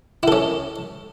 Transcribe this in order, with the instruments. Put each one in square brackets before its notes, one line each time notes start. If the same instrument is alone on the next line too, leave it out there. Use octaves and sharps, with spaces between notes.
[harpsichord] E4
A4
C#4